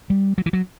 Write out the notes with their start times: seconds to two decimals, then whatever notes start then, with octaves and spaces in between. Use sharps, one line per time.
0.10 G3
0.38 F#3
0.46 E3
0.53 F#3